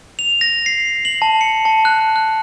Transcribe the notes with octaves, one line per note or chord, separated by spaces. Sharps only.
F7
A#6
C7
F#7
A5
C#7
A5
F#6
F#6